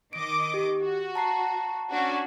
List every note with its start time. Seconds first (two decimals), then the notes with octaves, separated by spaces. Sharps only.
0.13 D#3 D#5 D6 D7
0.54 G4
0.83 F#4
1.15 A5 A#5 C7
1.90 C#4 D4 F#4